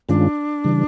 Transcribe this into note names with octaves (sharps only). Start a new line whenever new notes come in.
G2 D#3 G#3 C#4 D4 F4
C#3 E3 G3